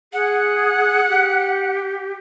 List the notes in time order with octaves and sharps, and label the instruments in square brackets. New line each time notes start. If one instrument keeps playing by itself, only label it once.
[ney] G#4 [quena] F#5
[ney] G4